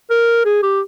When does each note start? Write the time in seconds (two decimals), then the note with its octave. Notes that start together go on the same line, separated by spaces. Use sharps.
0.10 A#4
0.45 G#4
0.63 G4